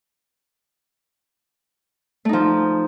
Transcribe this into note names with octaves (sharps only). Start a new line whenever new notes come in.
F3 A3 D#4